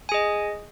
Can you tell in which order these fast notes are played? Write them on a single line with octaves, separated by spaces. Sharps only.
G#5 G#4 D#5